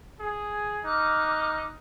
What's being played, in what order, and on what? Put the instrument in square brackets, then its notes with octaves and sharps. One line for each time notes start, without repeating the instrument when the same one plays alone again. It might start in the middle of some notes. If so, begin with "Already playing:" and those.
[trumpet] G#4
[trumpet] D#4 [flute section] D6 F6 F#6